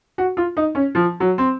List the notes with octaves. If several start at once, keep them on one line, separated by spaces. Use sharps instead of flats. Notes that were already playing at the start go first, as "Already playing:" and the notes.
F#4
F4
D#4
C#4
F3
F#3
C4